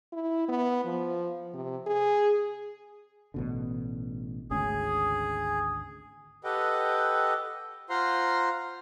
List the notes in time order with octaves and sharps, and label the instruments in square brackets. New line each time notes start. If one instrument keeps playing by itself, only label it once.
[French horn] E4
B3
F3
C3
G#4
[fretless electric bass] A1 B2 D3
[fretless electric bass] G#1 D2 C#3 [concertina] G#4
[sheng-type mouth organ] G4 A4 B4 D#5 F#5 G5
F4 C5 F5 F#5 A#5 C6